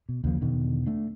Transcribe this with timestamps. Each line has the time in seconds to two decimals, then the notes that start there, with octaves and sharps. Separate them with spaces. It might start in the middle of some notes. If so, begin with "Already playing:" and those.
0.09 B2
0.24 D#2 C#3 F3 A#3
0.42 E2 B2 D3 D#3
0.87 A3 D4